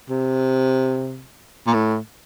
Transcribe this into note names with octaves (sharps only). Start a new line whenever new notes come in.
C3
A#2
A2